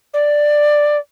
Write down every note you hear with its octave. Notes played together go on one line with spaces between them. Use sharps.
D5